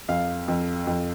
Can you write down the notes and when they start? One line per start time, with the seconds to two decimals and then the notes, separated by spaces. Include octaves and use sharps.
0.08 F2 F5
0.48 F2
0.87 F2